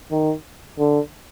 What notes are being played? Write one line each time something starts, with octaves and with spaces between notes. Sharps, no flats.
D#3
D3